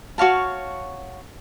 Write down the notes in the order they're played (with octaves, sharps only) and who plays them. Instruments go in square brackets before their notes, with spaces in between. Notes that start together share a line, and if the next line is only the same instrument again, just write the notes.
[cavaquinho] F#4 C#5 F5 A5